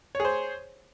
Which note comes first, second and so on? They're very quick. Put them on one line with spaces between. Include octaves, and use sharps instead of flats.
C#5 G#4 C5